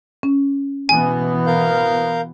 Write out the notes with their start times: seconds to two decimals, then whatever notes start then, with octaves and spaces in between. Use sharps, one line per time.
0.23 C#4
0.89 B2 E3 B3 G#5
1.46 A#4 F5 G6